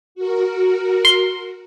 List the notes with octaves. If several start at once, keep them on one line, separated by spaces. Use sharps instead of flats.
F#4 A#4
C6